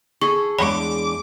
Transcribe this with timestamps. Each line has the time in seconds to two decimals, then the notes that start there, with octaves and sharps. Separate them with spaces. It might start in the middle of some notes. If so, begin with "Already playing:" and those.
0.22 G#4 A4 C#6
0.58 E2 G#3 D4 C#5 B5 D6